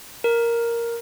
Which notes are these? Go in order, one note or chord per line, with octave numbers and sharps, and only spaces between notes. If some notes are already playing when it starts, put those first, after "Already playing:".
A#4